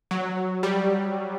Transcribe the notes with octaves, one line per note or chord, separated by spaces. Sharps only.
F#3
G3